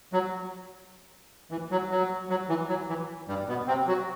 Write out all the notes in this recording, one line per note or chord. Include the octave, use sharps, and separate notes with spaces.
F#3
E3
F#3
F#3
F#3
E3
F#3
E3
G2 G3
B2 B3
C3 C4
F#3 F#4